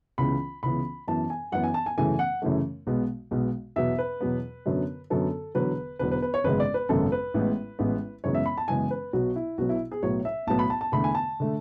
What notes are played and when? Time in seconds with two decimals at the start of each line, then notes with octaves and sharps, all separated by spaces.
0.18 C#2 C#3 E3 B3 B5
0.63 C#2 C#3 E3 B3 B5
1.08 F#2 E3 B3 A5
1.30 G#5
1.52 F#2 E3 B3 F#5
1.64 G#5
1.74 A5
1.86 G#5
1.98 F#2 C#3 E3 A3 G#5
2.19 F#5
2.42 F#2 C#3 E3 A3
2.87 B1 B2 G#3 B3
3.31 B1 B2 G#3 B3
3.76 E2 B2 F#3 B3 E5
3.98 B4
4.21 E2 B2 F#3 B3
4.66 F#2 D3 F#3 B3
5.10 F#2 D3 F#3 B3 A4
5.55 E1 E2 D3 F#3 B4
5.99 E1 E2 D3 F#3 B4
6.11 B4
6.22 B4
6.34 C#5
6.44 G#1 F#2 C#3 G#3 B3 B4
6.60 D5
6.74 B4
6.89 G#1 F#2 C#3 G#3 B3 A4
7.12 B4
7.34 A1 A2 G#3 B3
7.79 A1 A2 G#3 B3
8.24 F#2 C#3 E3 G#3 B3 C#5
8.35 E5
8.46 B5
8.58 A5
8.68 F#2 C#3 E3 G#3 B3 G#5
8.91 B4
9.13 B1 B2 F#3 B3 F#4
9.36 E4
9.58 B1 B2 F#3 B3 F#4
9.69 E4
9.91 G#4
10.03 B1 A2 F#3 B3 C#5
10.25 E5
10.47 B1 A2 F#3 B3 A5
10.59 B5
10.70 A5
10.81 A5
10.92 E2 D3 A3 B5
11.04 G#5
11.15 A5
11.40 D3 A3